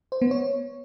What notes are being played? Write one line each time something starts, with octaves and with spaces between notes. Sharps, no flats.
C5
B3
C#5